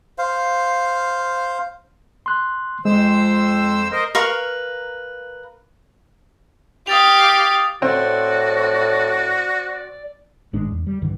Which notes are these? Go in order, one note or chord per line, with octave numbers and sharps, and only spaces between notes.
C5 F5
C6 F#6
F2 G#3 C5 E6
A#4 C5 D#5
A#4 B4 F5 C#6
G4 F5 D#6 A6 F7
A2 C4 F#4 D5
G#1 A2 G#3 D4
E2
G3
C2 G2 D3 E3